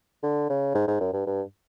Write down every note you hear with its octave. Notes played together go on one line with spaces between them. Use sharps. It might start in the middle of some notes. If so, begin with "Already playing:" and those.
D3
C#3
G#2
G#2
F#2
G2
G2